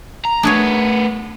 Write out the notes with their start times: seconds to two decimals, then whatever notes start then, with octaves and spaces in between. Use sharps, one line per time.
0.25 A#5
0.43 A3 B3 D4 G#4 C#5